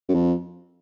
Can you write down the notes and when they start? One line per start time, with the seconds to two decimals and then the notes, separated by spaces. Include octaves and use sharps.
0.09 F#2
0.15 F2